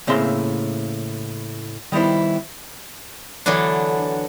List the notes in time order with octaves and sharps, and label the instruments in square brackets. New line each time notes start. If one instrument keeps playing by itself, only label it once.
[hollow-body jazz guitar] A2 C#3 A#3 C4 E5 C6
D#3 G3 B3 E4 C5
[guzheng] D3 E3 F#3 B3 D4